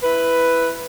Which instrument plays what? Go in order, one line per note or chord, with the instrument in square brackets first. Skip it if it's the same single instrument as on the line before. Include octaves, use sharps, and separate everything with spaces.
[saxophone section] E4 B4